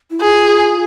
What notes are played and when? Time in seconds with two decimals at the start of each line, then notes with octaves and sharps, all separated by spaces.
0.11 E4
0.20 F4 G#4